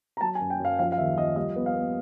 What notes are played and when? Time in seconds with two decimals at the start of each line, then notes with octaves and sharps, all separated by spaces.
0.17 A#5
0.21 F#3 A5
0.35 G#5
0.40 F#2
0.50 G5
0.60 F#2
0.65 F5
0.79 F3 F5
0.92 F5
0.98 D#2 E5
1.17 F3 D#5
1.36 G3 D#5
1.56 B3
1.66 F5
1.75 B3